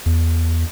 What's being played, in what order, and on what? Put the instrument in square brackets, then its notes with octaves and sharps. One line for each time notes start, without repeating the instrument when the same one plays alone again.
[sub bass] E2